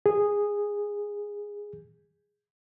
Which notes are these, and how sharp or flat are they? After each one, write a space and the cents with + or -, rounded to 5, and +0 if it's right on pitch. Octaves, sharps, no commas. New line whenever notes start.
G#4 -10